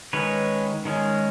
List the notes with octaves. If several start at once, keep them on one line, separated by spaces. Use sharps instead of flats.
D#3 G#3 C#4 B4 C#5
D#3 G#3 C#4